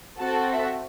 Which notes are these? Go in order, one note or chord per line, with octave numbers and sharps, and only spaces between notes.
C4 F#4 A4 A5
E5